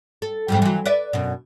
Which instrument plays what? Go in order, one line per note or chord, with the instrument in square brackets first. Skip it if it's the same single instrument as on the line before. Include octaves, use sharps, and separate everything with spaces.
[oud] A4
F2 G#2 G3
E3 F#3
B4 D5 E5
F#2 B2